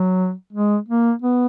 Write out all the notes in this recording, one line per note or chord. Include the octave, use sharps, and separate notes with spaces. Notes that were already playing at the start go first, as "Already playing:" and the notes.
Already playing: F#3
G#3
A#3
B3